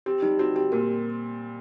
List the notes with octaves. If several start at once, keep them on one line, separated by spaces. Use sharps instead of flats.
C4 G4
G3 D#4
C4 F#4
C4 G4
A#2 A#4